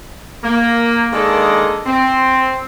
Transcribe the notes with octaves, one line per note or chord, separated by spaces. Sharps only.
A#3
D#3 G#3 A#3 D4 A4 D#5
C4